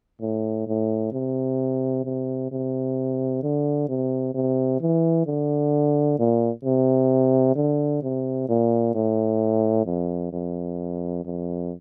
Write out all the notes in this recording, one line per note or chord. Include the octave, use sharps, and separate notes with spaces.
A2
A2
C3
C3
C3
D3
C3
C3
E3
D3
A#2
C3
D3
C3
A#2
A2
F2
F2
F2